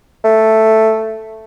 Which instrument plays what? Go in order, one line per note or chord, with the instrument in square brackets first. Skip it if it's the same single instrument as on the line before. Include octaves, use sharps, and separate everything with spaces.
[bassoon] A3